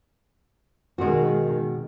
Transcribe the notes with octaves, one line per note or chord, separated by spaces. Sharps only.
B2 D#3 G#3 F#4